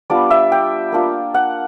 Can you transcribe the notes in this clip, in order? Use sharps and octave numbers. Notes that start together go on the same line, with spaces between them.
G3 B3 D4 F4 D5
E5
G5
A#3 D4 F4
F#5